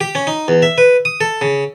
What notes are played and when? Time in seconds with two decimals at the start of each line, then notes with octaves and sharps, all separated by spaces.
0.01 G4
0.15 C#4
0.27 D#4
0.48 E2
0.62 E5
0.78 B4
1.05 D#6
1.21 A4
1.41 C#3